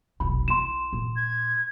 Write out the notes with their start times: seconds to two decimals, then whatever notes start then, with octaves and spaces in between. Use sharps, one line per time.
0.20 F1 B1 B5
0.48 E4 C6 E7
0.93 A#2
1.16 G#6